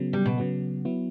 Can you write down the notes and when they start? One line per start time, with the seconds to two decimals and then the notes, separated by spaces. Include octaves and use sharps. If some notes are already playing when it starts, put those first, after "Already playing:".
Already playing: C#3 F#3 B3
0.13 G3
0.26 B2
0.38 C#3 F#3 B3
0.85 F#3 B3 E4